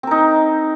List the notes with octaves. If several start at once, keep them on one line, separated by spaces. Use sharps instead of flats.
C4 D#4 A#4